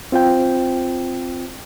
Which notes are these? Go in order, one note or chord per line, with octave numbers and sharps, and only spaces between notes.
C4 F4 C5 G5